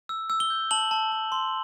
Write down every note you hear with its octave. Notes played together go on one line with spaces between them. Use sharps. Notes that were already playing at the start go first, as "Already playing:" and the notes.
E6
E6
G7
G6
A5 F#7
A5
A5
C6